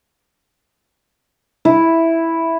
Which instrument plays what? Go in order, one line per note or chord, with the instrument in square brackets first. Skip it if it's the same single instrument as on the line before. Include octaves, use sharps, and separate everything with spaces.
[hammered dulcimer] E4